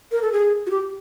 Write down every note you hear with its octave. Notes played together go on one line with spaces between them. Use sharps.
A#4
A4
G#4
F#4
G4